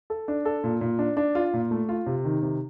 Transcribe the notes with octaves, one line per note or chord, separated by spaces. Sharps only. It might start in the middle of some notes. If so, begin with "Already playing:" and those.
A4
D4
A4
A#2
A#2
D4
D4
F4
A#2
A3
F4
C3
D#3
C3